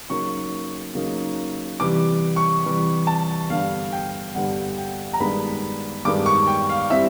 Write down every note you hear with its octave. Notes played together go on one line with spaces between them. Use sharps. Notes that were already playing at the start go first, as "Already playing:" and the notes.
C#3 F#3 A#3 D#4 C#6
C#3 F#3 A#3 D#4
C3 E3 G3 D6
C#6
C3 E3 G3
A5
G2 D3 G3 B3 F5
G5
G2 D3 G3 B3 F#5
G5
A#5
G2 D#3 G#3 B3 D4 B5
G2 D#3 G#3 B3 D4 D6
C#6
G5
F5
G3 C4 E4 E5